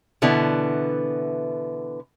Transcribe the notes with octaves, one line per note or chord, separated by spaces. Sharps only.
B2 D3 E3 B3 E4